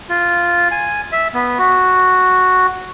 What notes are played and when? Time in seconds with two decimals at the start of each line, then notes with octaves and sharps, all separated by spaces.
0.09 F4
0.71 G#5
1.12 E5
1.34 B3
1.59 F#4